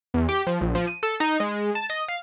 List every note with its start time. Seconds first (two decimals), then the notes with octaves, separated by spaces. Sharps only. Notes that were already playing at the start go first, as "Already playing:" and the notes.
0.14 E2
0.29 G4
0.47 F3
0.61 A#1
0.75 F3
0.87 D#7
1.03 A4
1.20 D#4
1.40 G#3
1.75 A5
1.90 D#5
2.08 F5